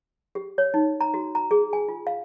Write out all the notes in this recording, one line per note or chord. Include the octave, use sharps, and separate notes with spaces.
G4
C#5
D#4
A#5
F#4
A#5
G#4
G#5
F4
F5